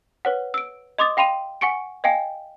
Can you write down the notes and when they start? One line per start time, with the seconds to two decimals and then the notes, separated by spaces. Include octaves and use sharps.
0.25 B4 C#5 F#5
0.54 E6 D7
0.98 D#5 C6 D6 D#6 A6
1.17 F5 G5 B5 C6 D#7
1.61 F#5 G#5 C#6 C#7 D7
2.04 D#5 F5 G5 G#5